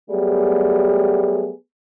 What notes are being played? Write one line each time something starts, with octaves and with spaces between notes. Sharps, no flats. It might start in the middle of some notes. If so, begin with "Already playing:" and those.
F#3 G3 A3 B3 G4 G#4